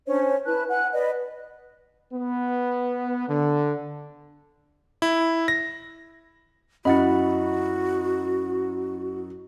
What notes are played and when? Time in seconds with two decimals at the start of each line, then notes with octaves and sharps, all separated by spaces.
0.07 C#4 D4 C5 C#5
0.45 E4 B4 A5 F#6
0.69 F#5 G#5 F#6
0.93 B4 D5 D#5
2.12 B3
3.28 D3
5.02 E4
5.48 A#6
6.85 F#2 E4 F#4 D#5 F#5 B5